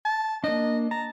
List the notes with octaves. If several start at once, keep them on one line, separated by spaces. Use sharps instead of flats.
A5
A#3 D4 D#5
A5 A#5